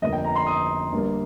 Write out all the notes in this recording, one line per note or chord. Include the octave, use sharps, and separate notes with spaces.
G1 F2 F3 A#3 D#5
G5
A#5
C6
D#6
G1 G2 G3 A#3